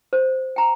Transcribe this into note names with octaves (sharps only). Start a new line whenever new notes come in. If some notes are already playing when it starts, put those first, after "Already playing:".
C5
G5 A#5